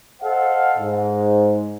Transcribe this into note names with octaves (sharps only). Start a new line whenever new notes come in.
A4 C5 D#5 F5 F#5
G#2